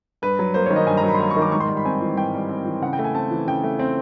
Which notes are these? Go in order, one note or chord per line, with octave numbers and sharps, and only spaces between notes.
G2 B4
F#3
A#3 C5
C#5
D#3
D#5
G2 G#5
A#5
F#3
B5
C6
A#3 B5
C#6
D#3
D6
G#2 C#6
C6
G3
B5
C4 G#5
E3
G#2 G5
G3
C4
E3
C#3 F#5
G5
A3
G#5
C4 A5
E3
C#3 G5
A3
C4